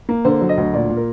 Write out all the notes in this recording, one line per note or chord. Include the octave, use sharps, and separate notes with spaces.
A#3
D3 C5
F#3
D#5
D2
A#2 D5
A#2
A#4